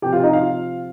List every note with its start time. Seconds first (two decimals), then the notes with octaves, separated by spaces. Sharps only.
0.02 C3 F3 G4 G5
0.13 F4 F5
0.23 D#4 D#5
0.33 F4 F5